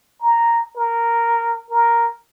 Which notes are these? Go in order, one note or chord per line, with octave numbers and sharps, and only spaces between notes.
A#5
A#4
A#4